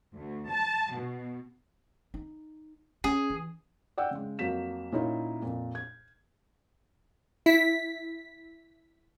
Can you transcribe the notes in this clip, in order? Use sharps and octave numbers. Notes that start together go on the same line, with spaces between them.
D2
A5
B2
D#4
C#4 G#4
E3
D5 F#5 G5 E6
C#3 G#3
F2 F#3 A#3 B6 E7
A#2 C#4 D#4 E4
F2 A#2
G#6
E4 B6